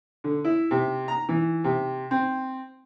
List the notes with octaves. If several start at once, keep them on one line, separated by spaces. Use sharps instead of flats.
D3
E4
C3
A#5
E3
C3
C4